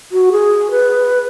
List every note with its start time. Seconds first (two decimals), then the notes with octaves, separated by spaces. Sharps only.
0.12 F#4
0.32 G#4
0.71 B4